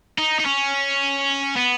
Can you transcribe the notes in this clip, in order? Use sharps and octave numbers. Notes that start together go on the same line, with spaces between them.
D#4
D#4
C#4
B3